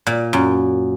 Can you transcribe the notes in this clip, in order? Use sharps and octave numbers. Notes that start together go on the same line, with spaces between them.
A#2
F#2